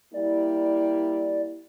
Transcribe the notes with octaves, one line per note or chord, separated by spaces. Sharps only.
G3 A#3 E4 D5